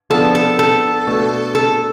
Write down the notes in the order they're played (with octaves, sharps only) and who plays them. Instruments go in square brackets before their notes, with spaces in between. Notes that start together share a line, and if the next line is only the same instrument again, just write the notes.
[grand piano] F3 B3 D4 [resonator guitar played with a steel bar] A4
[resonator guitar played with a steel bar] A4
A4
[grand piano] B2 A3 D4
[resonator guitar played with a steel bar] A4